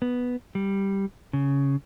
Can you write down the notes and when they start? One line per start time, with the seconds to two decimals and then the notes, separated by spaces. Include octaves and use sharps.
0.02 B3
0.55 G3
1.33 C#3